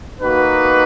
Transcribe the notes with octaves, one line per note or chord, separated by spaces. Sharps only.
A#3 D#4 F#4 B4